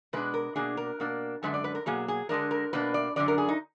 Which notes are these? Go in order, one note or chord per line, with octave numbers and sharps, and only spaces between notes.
B2 G#3 D4 B4
A#4
B2 A#3 D4 G#4
A#4
B2 A#3 D4
F#2 D3 G#3 D4 B4
D5
B4
A#4
B2 F#3 A#3 G#4
G#4
D3 G#3 D4 A#4
A#4
B2 A#3 D4 B4
D5
F#2 D3 G#3 D4 D5
A#4
G#4
D#4